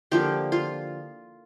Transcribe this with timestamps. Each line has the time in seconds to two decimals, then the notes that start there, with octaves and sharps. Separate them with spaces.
0.11 D3 F3 A#3 G4
0.52 F4